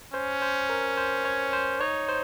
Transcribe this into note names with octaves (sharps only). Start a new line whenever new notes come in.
C#4 C5
C5
A#4
C5
C#5
C5
D#4 C#5
C5